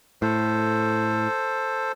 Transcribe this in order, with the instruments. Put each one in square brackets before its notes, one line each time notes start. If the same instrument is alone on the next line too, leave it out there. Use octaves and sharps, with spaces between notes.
[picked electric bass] A2 [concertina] A4 C5